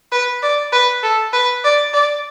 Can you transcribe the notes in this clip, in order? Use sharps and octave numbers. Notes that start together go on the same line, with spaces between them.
B4
D5
B4
A4
B4
D5
D5